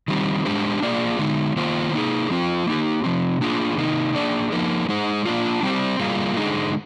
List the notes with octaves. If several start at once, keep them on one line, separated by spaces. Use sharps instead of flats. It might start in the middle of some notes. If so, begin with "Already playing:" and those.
D#3 G3 C4
G#3 D4 G4 C5
A#3 F4 G#4 D5
D3 G#3 D#4
D#3 A#3 F4 C5
A#3 D#4 G#4
F3 C4 F4 C5
A#3 D#4 G4
C3 F3 C4
A#3 D4 F4 G#4
C3 D#3 A#3 D#4
A#3 D4 G#4 D5
F3 A#3 D#4 A#4
G#3 D#4 G#4 C5
A#3 D4 F4
G3 C4 G4 C5
G3 A#3 F4 G#4
D3 G#3 D#4 G#4